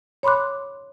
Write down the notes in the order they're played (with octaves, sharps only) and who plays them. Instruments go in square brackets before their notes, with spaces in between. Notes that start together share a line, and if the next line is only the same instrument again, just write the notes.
[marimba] C#5 B5 C6 D6 F#6